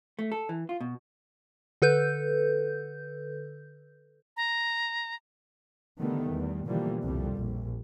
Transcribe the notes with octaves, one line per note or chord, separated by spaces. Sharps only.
A3
A4
E3
F4
B2
D3 A4 B4 G6
A#5
D3 D#3 G3 A3 B3
E2 G3
B2 D3 E3 F3 G3 A#3
C2 F2 G3
A#1